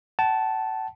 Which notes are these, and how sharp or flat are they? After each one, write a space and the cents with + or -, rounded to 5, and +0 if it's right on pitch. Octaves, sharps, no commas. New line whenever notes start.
F#5 +45 A5 -10